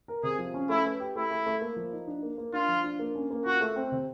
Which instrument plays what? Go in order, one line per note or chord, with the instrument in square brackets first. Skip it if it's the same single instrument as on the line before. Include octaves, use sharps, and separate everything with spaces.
[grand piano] A#4
[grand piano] C3 [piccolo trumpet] G#4
[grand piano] F3
C#4
[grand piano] A3 [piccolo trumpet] E4
[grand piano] B4
G4
[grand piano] A3 [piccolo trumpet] E4
[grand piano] A3
A3
A#3
F3
D#4
D4
A#3
A#3
[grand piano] D4 [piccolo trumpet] F4
[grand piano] F3
D4
A#3
C#4
A#3
[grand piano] F4 [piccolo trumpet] F#4
[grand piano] A3
C4
C3